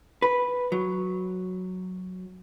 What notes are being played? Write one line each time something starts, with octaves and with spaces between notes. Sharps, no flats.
B4
F#3